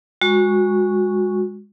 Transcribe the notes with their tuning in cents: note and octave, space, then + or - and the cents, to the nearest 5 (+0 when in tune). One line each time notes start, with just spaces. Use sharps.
G#3 -20 F#4 -20 C#6 +0